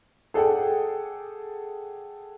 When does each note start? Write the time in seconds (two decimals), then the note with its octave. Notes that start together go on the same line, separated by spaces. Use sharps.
0.34 G#4 A4 D5 F#5 G5